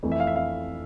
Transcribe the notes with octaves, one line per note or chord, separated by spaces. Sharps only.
F2 E3 A3
E5
F5
E5
F5